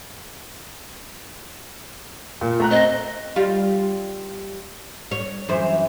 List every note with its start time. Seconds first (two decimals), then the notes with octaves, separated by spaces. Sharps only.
2.41 A#2
2.60 A3 A#5 F#6
2.71 C4 D#5
3.36 G3 F4
5.11 C#5
5.49 F#2 E3 C5